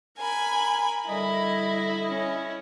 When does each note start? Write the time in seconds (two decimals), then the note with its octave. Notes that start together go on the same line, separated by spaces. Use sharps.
0.19 A#4 G#5 B5
1.08 D3 G3 E4 D#5 B5
2.09 C#4